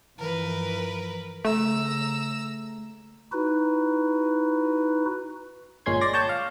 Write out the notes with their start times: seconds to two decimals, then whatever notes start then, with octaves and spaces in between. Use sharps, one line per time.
0.18 G2 E3 F3 A#4 B4
1.45 C#3 A3 A#5 E6
3.32 D#4 E4 F#4 B4
5.86 G1 A#2 G#3 C#4 C6 G#6
6.01 D5 C6 A#6
6.13 C#5 G5 A5 G6
6.29 F5